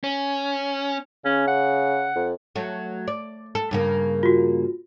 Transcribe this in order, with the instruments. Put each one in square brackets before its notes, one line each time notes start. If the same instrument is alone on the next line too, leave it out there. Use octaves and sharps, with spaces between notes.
[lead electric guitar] C#4
[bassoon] C#3 [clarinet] C#4
[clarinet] F#5
[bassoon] F2
[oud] F#3 A3
D5
A4
G2 C#3 A#3
[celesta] F4 F#4